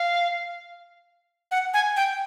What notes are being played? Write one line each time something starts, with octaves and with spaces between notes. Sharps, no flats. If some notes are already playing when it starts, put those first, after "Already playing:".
Already playing: F5
F#5
G#5
G5